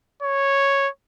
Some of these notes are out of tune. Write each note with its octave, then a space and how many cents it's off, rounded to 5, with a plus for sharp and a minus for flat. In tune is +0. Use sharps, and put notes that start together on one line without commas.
C#5 -5